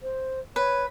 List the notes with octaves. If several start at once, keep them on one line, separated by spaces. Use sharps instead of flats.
C5
B4 C#5